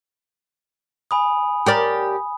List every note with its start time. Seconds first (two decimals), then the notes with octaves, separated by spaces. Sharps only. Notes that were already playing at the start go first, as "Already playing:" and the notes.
1.11 G#5 B5 D#6
1.66 G4 A#4 D5